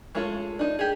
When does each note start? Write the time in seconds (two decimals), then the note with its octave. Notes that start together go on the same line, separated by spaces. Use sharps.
0.15 G#3 A3 C#4 F4 A4
0.59 D4 D#4
0.79 G4 G#4